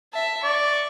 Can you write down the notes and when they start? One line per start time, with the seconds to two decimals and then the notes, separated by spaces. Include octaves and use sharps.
0.13 E5 A5
0.43 D5 C#6